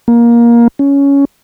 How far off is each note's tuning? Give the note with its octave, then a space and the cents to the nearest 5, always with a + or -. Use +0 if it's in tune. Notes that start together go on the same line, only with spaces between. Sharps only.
A#3 +15
C#4 +10